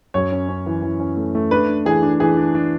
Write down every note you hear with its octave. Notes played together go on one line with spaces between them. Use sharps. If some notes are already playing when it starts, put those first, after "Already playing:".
F#2 C#5
C#4
C#4
E3
E3
C#4
A3
A3
D4 B4
D4
E3 G#4
D4
E3 G#4
D4
D4